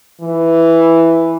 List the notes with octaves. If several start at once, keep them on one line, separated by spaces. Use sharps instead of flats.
E3